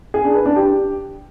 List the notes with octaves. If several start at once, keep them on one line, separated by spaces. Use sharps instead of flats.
G#4
D4
B4
D4
G4